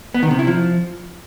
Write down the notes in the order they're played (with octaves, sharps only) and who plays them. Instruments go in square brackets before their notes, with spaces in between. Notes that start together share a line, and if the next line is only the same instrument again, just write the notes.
[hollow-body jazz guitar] B3
D#3
C3
E4
F3